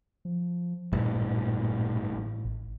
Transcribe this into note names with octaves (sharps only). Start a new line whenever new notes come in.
F3
A1 G2 A#2
A2
A1